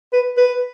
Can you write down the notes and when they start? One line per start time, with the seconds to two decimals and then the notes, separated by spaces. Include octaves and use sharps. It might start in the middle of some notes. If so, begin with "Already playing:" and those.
0.13 B4
0.37 B4